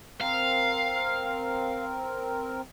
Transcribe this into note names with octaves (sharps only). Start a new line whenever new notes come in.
C4 A#4 F5